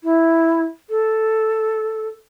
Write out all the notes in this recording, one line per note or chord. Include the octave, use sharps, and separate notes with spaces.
E4
A4